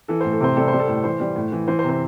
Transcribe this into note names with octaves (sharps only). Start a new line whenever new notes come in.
E3 A4
A2 C5
A4
C3 C5
G3 A4
G3 C5
A4
A2
E3 C5
G3
A2
E3
E3 C5
C5
C3
C5